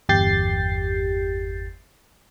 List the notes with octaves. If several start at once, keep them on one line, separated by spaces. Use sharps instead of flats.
G1 E2 G4 G6 A6 C7